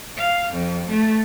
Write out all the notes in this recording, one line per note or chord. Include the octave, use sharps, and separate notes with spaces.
F5
F2
A3